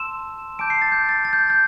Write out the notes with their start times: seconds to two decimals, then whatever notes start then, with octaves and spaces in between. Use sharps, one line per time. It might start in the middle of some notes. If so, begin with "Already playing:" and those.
Already playing: A5 C6 E6 E7
0.59 A5 D6 G6 D7
0.70 C7
0.82 A6
0.92 G6
1.09 A6
1.25 A6
1.33 G6
1.50 G6